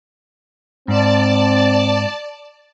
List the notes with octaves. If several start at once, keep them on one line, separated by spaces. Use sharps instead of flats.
G#2 C4 D5 A5